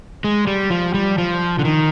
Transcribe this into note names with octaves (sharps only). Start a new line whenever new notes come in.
G#3
G3
F3
G3
F3
D3
D#3